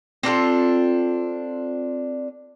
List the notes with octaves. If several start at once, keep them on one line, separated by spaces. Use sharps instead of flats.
C4 D4 F4 A4